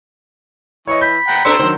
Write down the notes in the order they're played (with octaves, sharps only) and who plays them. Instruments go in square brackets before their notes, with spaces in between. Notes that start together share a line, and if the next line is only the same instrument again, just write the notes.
[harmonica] E3 [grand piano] C#5 D#5 [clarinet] C#6
[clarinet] B5 [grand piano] G6
[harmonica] F#5 G5 A#5
[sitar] B2 D4 A4 [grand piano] A#5 B6 C#7 [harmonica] C6 E6
[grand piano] D#3 F#3 [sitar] C5